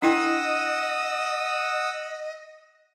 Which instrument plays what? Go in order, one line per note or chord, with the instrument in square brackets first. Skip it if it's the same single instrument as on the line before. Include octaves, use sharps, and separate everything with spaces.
[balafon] D4 E4 G5 [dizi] D#5 [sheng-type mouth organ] F#5 D#6 E6